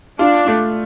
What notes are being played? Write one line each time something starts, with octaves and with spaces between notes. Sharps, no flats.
D4 F4
A3